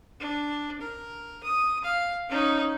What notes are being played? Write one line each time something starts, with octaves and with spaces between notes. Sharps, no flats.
D4
A#4
D#6
F5
C#4 D#4